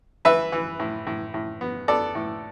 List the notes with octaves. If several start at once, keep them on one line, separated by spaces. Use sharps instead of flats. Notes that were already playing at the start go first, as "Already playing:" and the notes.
E3 B4 E5
E3
A2
A2
A2
B3
B3 A4 D5
A2